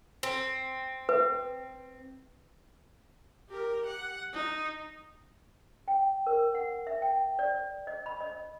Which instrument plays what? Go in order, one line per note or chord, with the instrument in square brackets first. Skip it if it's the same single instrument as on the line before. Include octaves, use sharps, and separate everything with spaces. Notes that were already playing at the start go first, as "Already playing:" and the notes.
[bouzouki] C4
[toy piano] B4
[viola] G4 A#4
F#5
D#4
[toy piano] G5
A#4
F#5
E5
G5
D5
D#5
B5
D#5